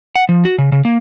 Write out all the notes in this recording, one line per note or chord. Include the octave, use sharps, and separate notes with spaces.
F#5
F3
F#4
C#3
C#3
A#3